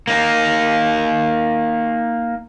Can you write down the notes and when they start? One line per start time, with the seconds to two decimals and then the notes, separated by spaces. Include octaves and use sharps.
0.07 A#3 D#4